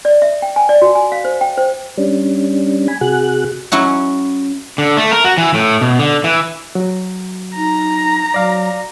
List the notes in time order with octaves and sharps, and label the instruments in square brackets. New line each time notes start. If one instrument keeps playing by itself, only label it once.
[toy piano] D5
E5
G5
G#5
D5
F#4
G#5
F5
C5
G5
C5
[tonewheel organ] G3 C#4 D4
G#5 B5
C3 F#4 G#4 F#6
[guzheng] F#3 C#4 E4 F#4
[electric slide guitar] D3
A3
A#4
F#4
E3
A2
B2
D3
E3
[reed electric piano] F#3 F#4
[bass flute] D#4 [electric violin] A#5
[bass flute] F#3 [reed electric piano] D5 F5 D6